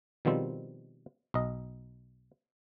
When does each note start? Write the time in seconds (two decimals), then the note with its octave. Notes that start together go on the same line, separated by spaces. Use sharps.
0.25 B2 D#3 F3 G3 C4
1.34 B1 D#5